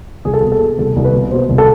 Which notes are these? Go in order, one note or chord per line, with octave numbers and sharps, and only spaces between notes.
C2 G#4
A4
B2 G#4
A4
B2
C2 A4
C2
B4
B2
B2 C5
C2
A4